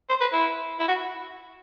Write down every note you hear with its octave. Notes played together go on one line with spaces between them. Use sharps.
C5
B4
E4
E4
F#4